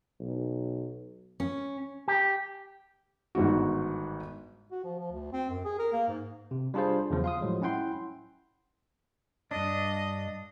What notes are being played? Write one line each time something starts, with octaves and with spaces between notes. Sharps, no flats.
B1
C#4
G4
G1 G#2 D#3 F#4
F#4
F3
F3
D2
C4
F#2
G#4
A#4
A#3
G#2
C3
G3 D4 F4 G#4 C5
E2 C#3 F3 F#3
F5 C6 D#6
A2 F3 F#3 G#3
C#4 E4 F#5 G5 C6
G2 D4 D#5